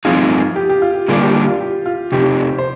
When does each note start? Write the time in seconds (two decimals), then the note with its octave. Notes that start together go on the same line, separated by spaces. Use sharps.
0.05 G2 F3 C4 D#4 F4 G#4
0.56 G4
0.70 G4
0.82 F4
0.95 G4
1.08 D3 G3 A#3 D4 F4 G#4
1.21 G4
1.34 G4
1.47 F4
1.60 G4
1.86 F4
2.12 F2 C3 D#4 G4
2.58 C5